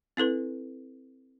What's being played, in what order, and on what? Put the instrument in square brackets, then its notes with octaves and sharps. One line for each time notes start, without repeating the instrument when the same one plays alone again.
[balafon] C4 E4 A4 B4